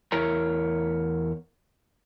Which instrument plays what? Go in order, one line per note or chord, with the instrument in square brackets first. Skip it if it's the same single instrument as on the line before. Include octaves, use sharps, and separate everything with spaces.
[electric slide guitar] E2 E4 A#4 C#5 A#5